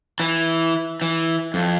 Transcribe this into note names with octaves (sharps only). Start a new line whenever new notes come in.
E3
E3
F2